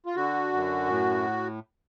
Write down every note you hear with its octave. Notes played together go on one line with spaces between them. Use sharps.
F4
D3 F#4
F#2
A2